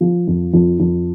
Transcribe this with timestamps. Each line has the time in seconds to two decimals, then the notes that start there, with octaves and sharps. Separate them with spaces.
0.01 F3
0.28 F2
0.54 F2
0.80 F2